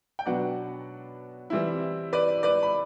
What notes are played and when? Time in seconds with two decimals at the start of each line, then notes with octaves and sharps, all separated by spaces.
0.19 G5
0.26 B2 F#3 B3 D4 D5 F#5
1.50 E3 G3 C4 E4
2.13 B4 D5
2.43 B4 D5
2.63 B5